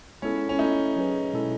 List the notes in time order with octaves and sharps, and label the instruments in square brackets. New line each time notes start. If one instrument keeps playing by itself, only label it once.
[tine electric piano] G#3 B3 E4 A4 [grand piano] C#4
[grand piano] C#4
[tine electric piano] A3 E4 A4 [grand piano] D#4
[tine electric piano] F#3 C#4 G#4 B4
B2 G#3 C#4 E4 A4